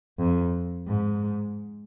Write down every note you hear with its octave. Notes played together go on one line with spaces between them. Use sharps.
F2
G#2